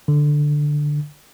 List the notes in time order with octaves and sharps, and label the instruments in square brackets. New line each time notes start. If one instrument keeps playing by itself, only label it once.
[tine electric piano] D3